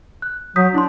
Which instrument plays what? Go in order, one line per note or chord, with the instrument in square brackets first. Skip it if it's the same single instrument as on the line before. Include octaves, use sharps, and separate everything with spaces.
[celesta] F#6
[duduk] F#3 [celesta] D#6 G6 B6
[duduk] D4 [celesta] E4 C6